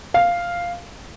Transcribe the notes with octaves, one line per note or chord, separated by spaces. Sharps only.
F5